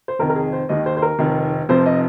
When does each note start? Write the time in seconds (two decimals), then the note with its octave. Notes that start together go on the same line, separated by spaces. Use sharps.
0.08 C5
0.19 F1 F2 D#3 A#4
0.30 A#4
0.36 G#4
0.53 C5
0.69 D#2 D#3 D#5
0.86 C5
0.97 C5
1.02 A#4
1.19 F1 F2 D#3
1.69 F1 F2 F3 C5
1.86 D#5